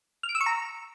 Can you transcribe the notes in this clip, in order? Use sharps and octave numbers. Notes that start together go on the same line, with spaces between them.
F6
D7
E6
C#6
A#5